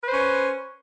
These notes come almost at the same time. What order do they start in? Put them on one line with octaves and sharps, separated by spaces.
B4 C5 C#4